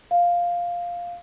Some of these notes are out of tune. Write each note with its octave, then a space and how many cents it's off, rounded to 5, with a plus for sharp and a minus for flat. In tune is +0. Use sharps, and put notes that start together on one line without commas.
F5 +0